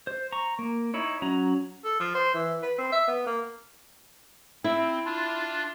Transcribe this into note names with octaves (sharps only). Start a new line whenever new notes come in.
C5
A#5 C#6
A#3
D#4 E4 C#5
F#3 C#4 A#5
A4
F3
C5
E3
B4
C4
E5
B3
A#3
C4 E4
D4 F4